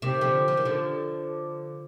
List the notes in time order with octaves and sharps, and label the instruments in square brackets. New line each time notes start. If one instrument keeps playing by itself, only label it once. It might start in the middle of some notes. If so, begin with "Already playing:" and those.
[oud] C3 D#3 [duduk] G4
[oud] D3 F3
F3
D#3
D3 F3